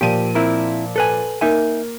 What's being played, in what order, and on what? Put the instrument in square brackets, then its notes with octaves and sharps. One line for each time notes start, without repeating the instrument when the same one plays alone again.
[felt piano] A#2 F3 D#7 [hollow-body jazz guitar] G4
[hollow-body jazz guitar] C4 E4 A#4
A4 B4 G#5
[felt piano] A#3 [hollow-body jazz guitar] D#4 E5 G#5